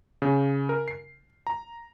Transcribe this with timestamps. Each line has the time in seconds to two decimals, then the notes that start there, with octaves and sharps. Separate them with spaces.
0.22 C#3
0.69 A#4
0.88 C7
1.47 A#5